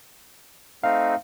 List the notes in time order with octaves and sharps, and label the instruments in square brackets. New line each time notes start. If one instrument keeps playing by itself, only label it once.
[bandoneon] A3 C4 D#4 [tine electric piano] F5